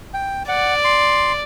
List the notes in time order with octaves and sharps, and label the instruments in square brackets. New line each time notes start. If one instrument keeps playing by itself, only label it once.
[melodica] G5
[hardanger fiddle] D5 [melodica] F#5
[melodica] C6